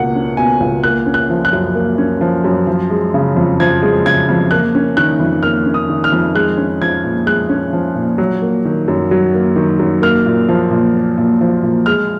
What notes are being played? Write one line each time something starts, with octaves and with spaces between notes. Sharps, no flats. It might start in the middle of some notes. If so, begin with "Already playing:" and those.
Already playing: C#2 B2 A#3 F#5
C#4
B2 G#5
C#2
A#3 F#6
C#4
F#6
F3
F#6
F#2
A#3
C#4
F3
F#2
F3
G#3
C#3
F2
F3 G#6
G#3
C#3 G#6
F2
A#3 F#6
C#4
D#3 F#6
F2
A#3 F6
C#4
D#6
D#3
F6
F2
G#3 F#6
C#4
F3 G#6
A#2
G#3 F#6
C#4
F3
A#2
F#3
A#3
D#3
F#2
F#3
A#3
D#3
F#2
A#3 F6
A#2
F3
A#2
A#3
A#2
F3
A#2
G#3 F6